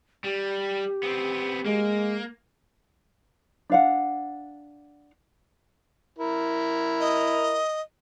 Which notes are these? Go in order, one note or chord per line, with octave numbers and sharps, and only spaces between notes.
G3 G4
B3 C4
G#3 A#3
D4 F5 F#5
E4 A#4
D#5